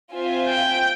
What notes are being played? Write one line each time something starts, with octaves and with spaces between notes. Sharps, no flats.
C4 F4 C5 E5 G#5
G5